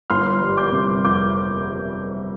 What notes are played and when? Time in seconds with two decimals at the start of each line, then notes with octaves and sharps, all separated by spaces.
0.10 G1 C6 F6
0.41 G3
0.57 D6 G6
0.72 C3
1.04 F2 D6 G6